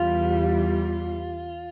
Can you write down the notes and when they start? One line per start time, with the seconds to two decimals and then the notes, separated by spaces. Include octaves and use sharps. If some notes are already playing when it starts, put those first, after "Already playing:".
Already playing: E2 E3 G3 F4